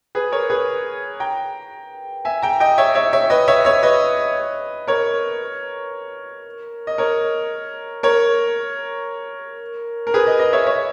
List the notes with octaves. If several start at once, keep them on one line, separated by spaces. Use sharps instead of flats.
G#4 B4
A#4 C#5
G#4 B4
G5 A#5
E5 G#5
G5 A#5
D#5 G5
C#5 E5
C#5 E5
C#5 E5
B4 D#5
C#5 E5
C#5 E5
B4 D#5
A#4 C#5
D#5
A#4 C#5
A#4 C#5
A#4
G#4 B4
B4 D#5
B4 D#5
C#5 E5
C#5 E5